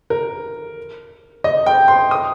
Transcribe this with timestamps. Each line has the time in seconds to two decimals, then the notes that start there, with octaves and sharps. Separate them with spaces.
0.10 A#4
1.44 D#5
1.66 G5
1.88 C6
2.11 D#6